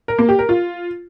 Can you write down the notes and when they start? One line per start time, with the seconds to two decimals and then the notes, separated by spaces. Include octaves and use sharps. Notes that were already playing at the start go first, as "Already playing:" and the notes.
0.08 A#4
0.18 A#3
0.29 G4
0.39 A#4
0.49 F4